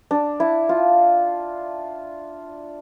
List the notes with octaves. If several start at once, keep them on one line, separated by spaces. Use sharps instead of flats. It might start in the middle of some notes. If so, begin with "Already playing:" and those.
D4
E4
F4